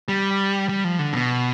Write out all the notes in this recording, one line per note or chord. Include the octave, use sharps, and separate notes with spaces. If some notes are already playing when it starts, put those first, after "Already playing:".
G3
G3
F3
D3
B2